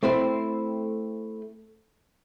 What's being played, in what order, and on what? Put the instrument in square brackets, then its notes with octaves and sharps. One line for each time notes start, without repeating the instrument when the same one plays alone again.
[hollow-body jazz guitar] A3 C4 E4 C5